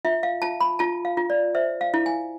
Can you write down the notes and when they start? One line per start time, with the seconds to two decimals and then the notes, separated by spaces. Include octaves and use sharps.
0.05 F4 E5
0.23 F5
0.42 F4 A5
0.61 B5
0.79 F4 A5
1.05 F5
1.17 F4
1.30 D5
1.55 C5 E5
1.81 F5
1.94 E4
2.06 G#5